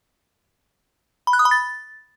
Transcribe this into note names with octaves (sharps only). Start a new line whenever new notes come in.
B5
F#6
D#6
B5
A6